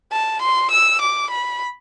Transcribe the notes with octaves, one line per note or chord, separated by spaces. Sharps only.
A5
C6
E6
D6
B5